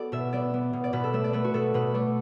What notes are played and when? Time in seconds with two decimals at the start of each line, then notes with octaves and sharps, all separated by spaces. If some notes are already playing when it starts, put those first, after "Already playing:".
Already playing: B3 F#4 A4 D5
0.12 B2 E5
0.33 B3 D5
0.54 B3
0.73 B2
0.84 D5
0.93 B2 B4
1.04 A4
1.13 A3 E5
1.24 D5
1.33 A3 B4
1.44 F#4
1.54 B2 A4
1.74 B2 B4
1.94 A3 D5